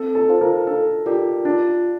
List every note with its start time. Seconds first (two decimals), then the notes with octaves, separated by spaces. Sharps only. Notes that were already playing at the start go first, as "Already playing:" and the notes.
Already playing: C4 A4
0.15 A4
0.28 F4 C5 F5 A5
0.41 A#4
0.67 D4 A4
1.06 F4 G4 A#4 D5
1.45 D4 F4